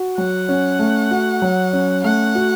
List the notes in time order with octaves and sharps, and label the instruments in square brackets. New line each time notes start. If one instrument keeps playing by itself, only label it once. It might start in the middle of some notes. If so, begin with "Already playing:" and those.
Already playing: [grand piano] F#4
[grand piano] F#3 [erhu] F#5
[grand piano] C#4
A3
F#4
F#3
C#4
[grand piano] A3 [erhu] F#5
[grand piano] F#4